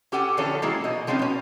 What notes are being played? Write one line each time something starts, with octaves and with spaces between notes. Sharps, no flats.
C#4 G4 A4 F#5 G#5
D3 E3 F3 C#4 A4 C#5
E3 F#3 G#3 A#3 E4 G#4
B2 D#5
F3 G#3 C4 C#4 D#4
B2 C#4